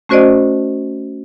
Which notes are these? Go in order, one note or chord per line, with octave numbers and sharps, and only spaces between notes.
A3 C#4 F#4 C5 D5 D#5